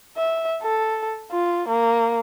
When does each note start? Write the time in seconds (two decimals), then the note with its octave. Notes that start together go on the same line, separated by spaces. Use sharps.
0.17 E5
0.63 A4
1.32 F4
1.68 A#3